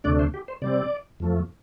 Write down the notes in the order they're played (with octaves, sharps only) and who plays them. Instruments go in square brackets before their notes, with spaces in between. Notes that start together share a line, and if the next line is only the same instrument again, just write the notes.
[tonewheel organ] D2 C3 A3 D4 D5
C5
G4
C5
C3 G3 C4 D5
F2 F3 A3